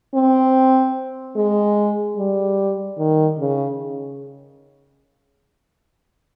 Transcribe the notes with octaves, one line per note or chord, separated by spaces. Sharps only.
C4
G#3
G3
D#3
C#3